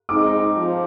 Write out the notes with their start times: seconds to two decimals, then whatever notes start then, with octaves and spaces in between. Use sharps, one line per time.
0.09 G#3 C4 D#4 D6
0.55 F3